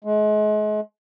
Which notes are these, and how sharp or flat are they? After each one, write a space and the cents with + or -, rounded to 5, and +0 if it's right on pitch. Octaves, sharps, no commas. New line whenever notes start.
G#3 +35